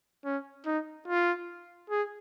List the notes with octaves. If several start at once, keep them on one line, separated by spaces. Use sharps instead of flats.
C#4
D#4
F4
G#4